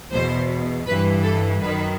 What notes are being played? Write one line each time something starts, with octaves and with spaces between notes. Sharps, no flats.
E2 B2 C5
G2 E3 B4
A4
F#2 D#3 B4